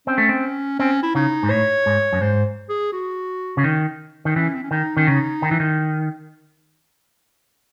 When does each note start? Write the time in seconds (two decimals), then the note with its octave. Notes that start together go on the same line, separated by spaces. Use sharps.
0.07 C4 C#4
0.18 A3
0.29 C4
0.79 C4 C#4
1.03 E4
1.15 C#3 D#4
1.43 G#2
1.50 A2 C#5
1.86 G#2
2.13 F#2
2.21 G#2 C5
2.69 G#4
2.93 F#4
3.57 C#3
3.64 D#3
4.25 D#3
4.35 E3 C#4
4.54 C4
4.63 C#4
4.71 D#3 D#4
4.97 D#3 C#4
5.07 C#3 D#4
5.42 D#3
5.51 E3
5.60 D#3